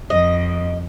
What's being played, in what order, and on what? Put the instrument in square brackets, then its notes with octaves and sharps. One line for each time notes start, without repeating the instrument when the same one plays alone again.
[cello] F2 [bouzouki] D#5